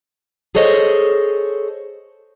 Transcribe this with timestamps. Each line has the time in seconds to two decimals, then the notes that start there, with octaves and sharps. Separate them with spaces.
0.55 G#4 A4 C5 C#5 D#5